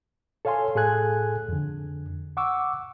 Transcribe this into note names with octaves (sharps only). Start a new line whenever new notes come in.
A4 C#5 F5 G#5 C6
A2 G#4 A4 G#5 F#6 G#6
F2 D3
F#5 C#6 D6 E6